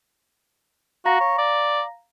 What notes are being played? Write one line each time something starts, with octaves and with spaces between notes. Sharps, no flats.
F#4 F5 A#5 A#6
C#5
D5